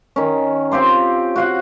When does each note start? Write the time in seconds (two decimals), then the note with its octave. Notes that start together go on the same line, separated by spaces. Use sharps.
0.16 D#3 C#4
0.71 C4 F4 G4 C6
1.36 F#4 F5 F#5